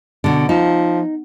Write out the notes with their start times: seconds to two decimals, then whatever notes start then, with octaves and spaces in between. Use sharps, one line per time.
0.24 B2 D3
0.49 F3 D#4